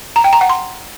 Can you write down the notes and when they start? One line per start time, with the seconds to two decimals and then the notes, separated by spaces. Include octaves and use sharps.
0.16 A#5
0.24 G5
0.33 A#5
0.41 F#5
0.49 C6